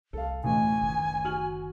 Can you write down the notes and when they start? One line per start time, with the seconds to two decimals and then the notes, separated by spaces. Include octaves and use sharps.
0.13 C2 A4 F5
0.44 A1 D2 B2 A3 G#5
0.82 F#1 D3 D#3
1.24 F#4 F6 F#7